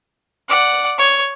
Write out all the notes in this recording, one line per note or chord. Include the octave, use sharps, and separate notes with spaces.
D5 F#5
C#5